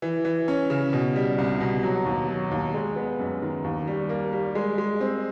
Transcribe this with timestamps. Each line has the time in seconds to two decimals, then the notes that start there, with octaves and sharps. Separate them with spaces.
0.02 E3
0.25 E3
0.48 C#4
0.70 C#3
0.93 B2
1.16 G3
1.38 C2
1.61 B2
1.83 F#3
2.06 D#2
2.29 F#3
2.51 D#2
2.74 G#3
2.96 B3
3.19 F#2
3.42 D#3
3.64 D#2
3.87 G3
4.09 A#3
4.33 G3
4.55 G#3
4.78 G#3
5.01 C4